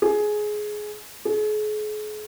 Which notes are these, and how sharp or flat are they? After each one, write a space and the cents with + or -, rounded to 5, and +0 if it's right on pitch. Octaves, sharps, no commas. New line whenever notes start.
G#4 +15
G#4 +40